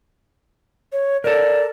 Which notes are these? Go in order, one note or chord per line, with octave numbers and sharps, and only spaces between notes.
C#5
A4 A#4 D5